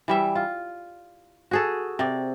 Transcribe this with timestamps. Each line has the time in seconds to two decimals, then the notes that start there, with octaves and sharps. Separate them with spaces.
0.08 E3 G3 E5
0.35 F4
1.51 F#4 G#4 A4
1.99 C3 D5